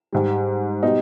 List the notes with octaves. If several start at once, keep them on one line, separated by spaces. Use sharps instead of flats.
G#2 G3
B2 G3 D#4